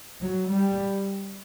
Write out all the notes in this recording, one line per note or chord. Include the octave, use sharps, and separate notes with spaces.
F#3
G3